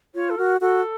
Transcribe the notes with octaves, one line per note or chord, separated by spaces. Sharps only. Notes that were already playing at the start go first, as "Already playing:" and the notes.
F4 C#5
A4
F#4 A#4
F#4 A4